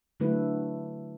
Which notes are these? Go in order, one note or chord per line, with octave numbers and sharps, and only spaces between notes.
D3 F#3 A3 E4 B4